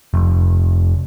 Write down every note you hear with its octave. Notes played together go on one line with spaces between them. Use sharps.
F1